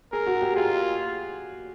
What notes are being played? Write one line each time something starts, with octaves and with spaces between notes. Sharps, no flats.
G#4 A#4
F#4
G4
F4 G#4